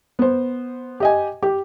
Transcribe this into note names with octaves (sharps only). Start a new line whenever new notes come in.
B3 C5
G4 D#5 G#5
G4